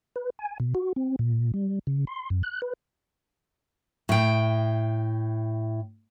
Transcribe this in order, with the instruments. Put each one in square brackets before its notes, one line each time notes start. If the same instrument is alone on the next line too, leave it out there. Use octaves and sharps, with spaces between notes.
[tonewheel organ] B4
G#5
B2
F#4
C4
A#2
G3
C#3
C6
F#2
F#6
B4
[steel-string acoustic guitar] A2 G5